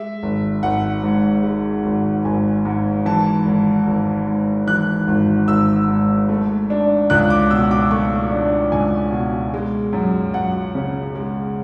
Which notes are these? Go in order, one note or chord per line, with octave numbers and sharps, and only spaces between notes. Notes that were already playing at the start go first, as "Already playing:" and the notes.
Already playing: G#3 E5
G#1
G#1 F#5
G#2
G#3
G#1
G#1 G#5
G#2
E3 A5
G#1
G#1
G#2
E3 F#6
G#1
G#1 E6
G#2
A3
D4
C#2 F#6
D6
B2 E6
D6
A3 C#6
D4
C#2 G#5
B2
G#3
F#2
F#2 F#5
C#3
G#3